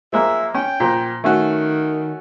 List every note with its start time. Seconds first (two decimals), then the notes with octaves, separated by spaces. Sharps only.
0.13 F3 G#3 A#3 E5
0.54 C#4 G5
0.80 A#2 F3
1.24 D#3 A3 C#4 F#4